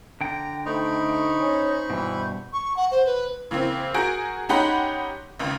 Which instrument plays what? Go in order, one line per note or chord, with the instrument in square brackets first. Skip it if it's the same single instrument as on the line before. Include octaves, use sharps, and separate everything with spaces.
[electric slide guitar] D3 G5 [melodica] A#5
[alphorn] A3 [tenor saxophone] D#4 [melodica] C5 B5 C#6
[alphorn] C#4
[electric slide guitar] G2 B2 [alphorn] E3
[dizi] C#6
F#5
C5
B4
[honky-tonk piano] C#3 E3 A#3 C4
F#4 G#4 A#4 G6 D7
C#4 D#4 G4 F#5 B5 C6
G#1 C#2 C#3